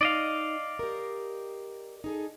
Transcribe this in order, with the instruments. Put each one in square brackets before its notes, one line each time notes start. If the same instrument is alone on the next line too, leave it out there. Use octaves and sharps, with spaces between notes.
[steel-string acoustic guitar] D#4 [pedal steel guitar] D5 D#5 F5
[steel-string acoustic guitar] G4 A#4
D#4 G#4 A4